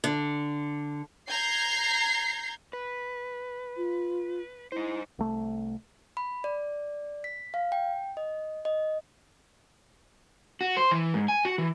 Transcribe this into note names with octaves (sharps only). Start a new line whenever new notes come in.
D3
A#5 G6 G#6 C7
B4
F4
D#4 E4 C5
C2 A3
B5
D5
B6
F5
G5
D#5
D#5
F#4
C5
E3
G#2
G#5
F#4
E3